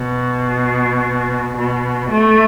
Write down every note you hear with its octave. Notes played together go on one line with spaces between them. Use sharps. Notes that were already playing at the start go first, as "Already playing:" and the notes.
Already playing: B2
B2
A3